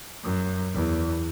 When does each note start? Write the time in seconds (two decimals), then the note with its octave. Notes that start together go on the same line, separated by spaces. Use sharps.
0.23 F#2
0.73 E2